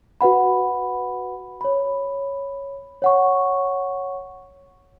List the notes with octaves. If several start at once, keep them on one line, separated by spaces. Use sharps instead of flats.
F#4 B4 F#5 B5
C#5 B5
C#5 F#5 C#6